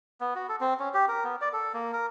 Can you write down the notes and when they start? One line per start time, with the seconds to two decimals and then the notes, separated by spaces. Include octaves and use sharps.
0.21 B3
0.35 F#4
0.49 A4
0.61 C4
0.79 C#4
0.94 G4
1.08 A#4
1.24 B3
1.41 D5
1.53 A4
1.74 A#3
1.93 A#4